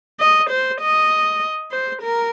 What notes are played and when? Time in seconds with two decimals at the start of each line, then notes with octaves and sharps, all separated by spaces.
0.20 D#5
0.50 C5
0.81 D#5
1.72 C5
2.02 A#4